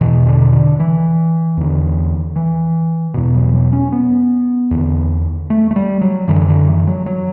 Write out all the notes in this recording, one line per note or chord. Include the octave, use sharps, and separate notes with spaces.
E2 B2 E3
D3
D3
E3
E2 D3
E3
E2 B2
F#3
F#3
C#4
B3
E2 D3
A3
A3
G3
F#3
F#2 D3 E3
D3
E3
F#3
F#3